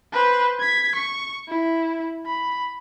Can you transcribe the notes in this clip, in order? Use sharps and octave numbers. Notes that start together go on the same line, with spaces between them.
B4 C5
G#6 B6
C#6
E4
B5